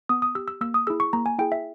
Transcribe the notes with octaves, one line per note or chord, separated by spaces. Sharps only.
B3 D#6
D#6
G4 E6
E6
A#3 E6
D#6
E4 G#4 E6
C#6
A#3 A#5
G#5
E4 G#4 G5
E5